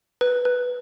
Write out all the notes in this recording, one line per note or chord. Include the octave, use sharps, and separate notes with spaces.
B4
B4